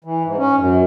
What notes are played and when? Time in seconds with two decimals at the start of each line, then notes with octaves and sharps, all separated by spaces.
0.04 E3
0.24 G#2
0.37 C#4
0.58 F#2